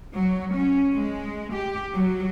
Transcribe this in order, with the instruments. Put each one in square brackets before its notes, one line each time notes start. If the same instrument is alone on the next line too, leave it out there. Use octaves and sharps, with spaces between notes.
[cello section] F#3
C#4
G#3
G4
F#3